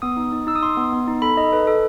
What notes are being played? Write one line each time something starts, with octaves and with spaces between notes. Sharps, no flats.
B3 D#6
D#4
D#4
D#4 E6
D#6
D#4 C6
B3
B3
D#4
A4 B5
D#4 D#5
A4 B4
A4